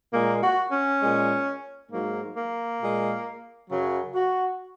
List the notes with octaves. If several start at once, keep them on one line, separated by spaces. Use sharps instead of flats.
A#2 G#3 A#3
F#4
C#4
A#2 G#3
G#2 F#3 A#3
A#3
A#2 G#3
F#2 C#3 F#3
F#4